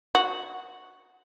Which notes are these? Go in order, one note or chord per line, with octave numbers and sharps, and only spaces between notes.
F#4